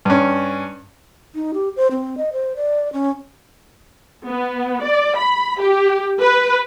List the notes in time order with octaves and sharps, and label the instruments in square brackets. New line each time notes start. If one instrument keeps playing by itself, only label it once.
[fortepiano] G2 C#4
[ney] D#4
G4
C5
C4
D#5
C5
D5
C#4
[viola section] B3
D5
B5
G4
B4